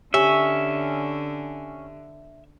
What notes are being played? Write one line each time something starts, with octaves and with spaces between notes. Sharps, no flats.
D3 C#4 G4 E5